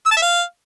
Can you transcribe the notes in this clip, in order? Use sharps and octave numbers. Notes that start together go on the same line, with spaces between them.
E6
A5
E5
F5